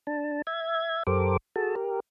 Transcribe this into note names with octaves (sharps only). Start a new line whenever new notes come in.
D4 A5
E5 G#6
F#2 G4 A4 A#4 C5 D6
F#4 G#4 A4 A5
G4 A#4